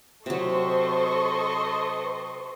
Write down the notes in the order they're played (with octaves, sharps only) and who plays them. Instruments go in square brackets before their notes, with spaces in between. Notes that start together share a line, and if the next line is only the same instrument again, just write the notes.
[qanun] C3 F#3 [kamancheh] A4 D#5 [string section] C5 C6 C#6